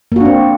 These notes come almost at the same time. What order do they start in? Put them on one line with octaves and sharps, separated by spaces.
A#3 F#4 D4 C4